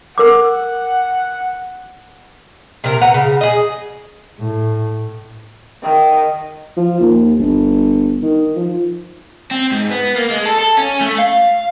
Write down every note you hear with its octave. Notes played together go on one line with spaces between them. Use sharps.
A#4 F#5 D6
C3 A#4
B4 F#5 A#5
C#3
G#4 D#5
A2
D#3
F3
D#2
G1
D#3
F3
C4
G#2
B3
A#3
G#3
A4
A4
C#4
A3
F5